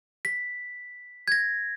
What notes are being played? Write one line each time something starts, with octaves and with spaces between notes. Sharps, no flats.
B6
G#6 A#6